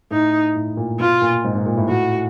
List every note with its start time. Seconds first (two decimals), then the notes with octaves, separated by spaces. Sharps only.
0.11 A2 D#4
0.55 A2
0.77 A#2
1.00 B2 F4
1.22 A#2
1.44 G#2
1.55 G#2
1.66 A#2
1.77 A2
1.88 A2 F#4